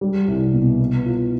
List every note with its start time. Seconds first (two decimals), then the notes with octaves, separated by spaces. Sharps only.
0.01 G3
0.28 C2
0.53 B2
0.80 B3
1.06 F4